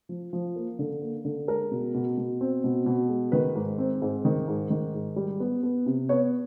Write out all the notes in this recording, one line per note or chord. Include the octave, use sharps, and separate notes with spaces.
F3
F3
A#3
D3
A#3
D3
G#3 A#4
B2
B2
B2
C4
B2
B2
G#3
D#3 B4
G#2
C4
G#2
D#3
G#2
D#3
G#2
G3
B3
B3
C3
B3 C#5